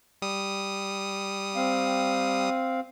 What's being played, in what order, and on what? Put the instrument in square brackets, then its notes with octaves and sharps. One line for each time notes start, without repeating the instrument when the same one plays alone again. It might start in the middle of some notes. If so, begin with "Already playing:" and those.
[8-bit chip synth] G3 D#6
[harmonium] C4 F5